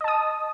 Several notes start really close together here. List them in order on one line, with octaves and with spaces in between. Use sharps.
D#5 A5 D#6